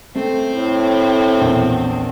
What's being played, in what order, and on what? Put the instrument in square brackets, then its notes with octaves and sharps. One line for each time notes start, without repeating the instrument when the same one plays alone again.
[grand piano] A3 [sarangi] C4
[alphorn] A2
[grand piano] A#1 E2